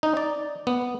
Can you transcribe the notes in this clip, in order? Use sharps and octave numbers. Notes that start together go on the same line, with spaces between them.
D#4
D5
B3